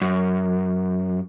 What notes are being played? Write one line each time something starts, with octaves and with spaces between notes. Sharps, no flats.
F#2